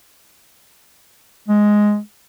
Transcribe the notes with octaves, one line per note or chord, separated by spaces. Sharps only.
G#3